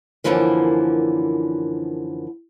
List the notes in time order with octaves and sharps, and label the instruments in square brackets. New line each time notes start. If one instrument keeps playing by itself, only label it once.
[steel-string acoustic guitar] F#2 A2 D3 E3 F3 A#3